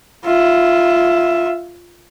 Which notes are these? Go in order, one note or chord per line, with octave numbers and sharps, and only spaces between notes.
F4 E5